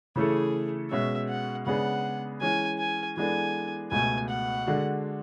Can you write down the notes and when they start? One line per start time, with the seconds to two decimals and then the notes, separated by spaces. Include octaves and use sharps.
0.16 C#3 E3 A3 E4 G#4 A4
0.91 B2 G#3 C#4 E5
1.29 F#5
1.66 C#3 G#3 B3 D4 G#4 F#5
2.41 E3 G#3 C#4 G#5
2.79 G#5
3.17 E3 G#3 B3 D4 A4 G#5
3.92 C#2 B2 A3 G#5
4.29 F#5
4.67 D3 G#3 D4 F#4 A4